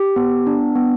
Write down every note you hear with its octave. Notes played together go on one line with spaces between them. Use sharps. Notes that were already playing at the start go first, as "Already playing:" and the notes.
Already playing: G4
B3
D4
B3